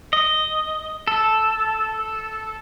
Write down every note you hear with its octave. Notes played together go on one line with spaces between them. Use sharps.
D#5
A4